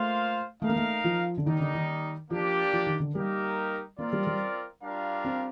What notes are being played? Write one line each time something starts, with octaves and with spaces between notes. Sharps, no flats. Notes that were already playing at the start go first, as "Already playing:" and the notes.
Already playing: A3 A#3 F4 C5 F5
A3 D#4 A#4 F5
A#3
A3
F3
D3
D#3 G3 A#3 D#4
D3
D#3
F3 A#3 D4 G4 D5
F3
D#3
D3
G3 A#3 D#4 G4 A#4
A#3 C4 F4 A#4 D5
G3
G3
G3 D4 F4 A#4 F5
C4